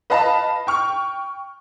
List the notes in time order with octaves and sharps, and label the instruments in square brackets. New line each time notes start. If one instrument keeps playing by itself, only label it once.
[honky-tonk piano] B4 D#5 F5 A5 B5
G5 C#6 F6